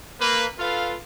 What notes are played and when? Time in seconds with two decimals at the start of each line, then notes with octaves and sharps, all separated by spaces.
0.20 A#3 B4
0.59 F4 A4 B4 F5